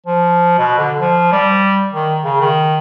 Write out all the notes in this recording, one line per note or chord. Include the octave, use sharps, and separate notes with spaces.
F3
B2
D3
F3
G3
D#3
C#3
D#3